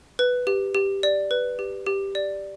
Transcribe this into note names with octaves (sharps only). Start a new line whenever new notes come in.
B4
G4
G4
D5
B4
G4
G4
D5